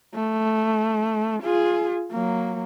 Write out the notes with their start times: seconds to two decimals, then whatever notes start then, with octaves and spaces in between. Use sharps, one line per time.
0.15 A3
1.43 F4 G#4
2.12 F#3 A#3